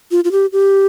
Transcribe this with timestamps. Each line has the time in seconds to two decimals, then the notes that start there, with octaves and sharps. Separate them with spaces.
0.11 F4
0.24 F4
0.32 G4
0.53 G4